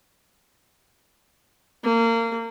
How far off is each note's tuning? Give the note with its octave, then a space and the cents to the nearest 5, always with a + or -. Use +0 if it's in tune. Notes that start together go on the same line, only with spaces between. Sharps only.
A#3 -25